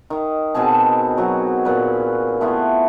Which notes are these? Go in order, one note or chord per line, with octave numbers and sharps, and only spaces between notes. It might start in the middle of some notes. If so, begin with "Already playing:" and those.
D#3
B2 C4 G#4 A5
F#3 F#4
A#2 B4
A3 B3 E4 F4